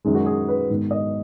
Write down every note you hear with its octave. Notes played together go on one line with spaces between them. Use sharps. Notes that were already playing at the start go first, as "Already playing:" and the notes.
F#2 D#3 G#3
F#4
G#4
B4
G#2 D#3 B3
D#5